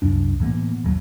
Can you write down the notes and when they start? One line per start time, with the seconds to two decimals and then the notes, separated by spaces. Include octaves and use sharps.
0.02 C2 F#2 D4
0.40 A2 E3 A#3 B3
0.84 D#1 G#1 F#3